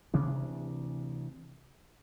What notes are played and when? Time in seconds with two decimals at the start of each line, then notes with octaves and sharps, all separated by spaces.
0.14 D2 C3 E3 D4